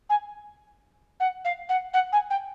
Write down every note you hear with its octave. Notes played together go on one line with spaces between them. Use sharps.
G#5
F#5
F5
F#5
F#5
G#5
G5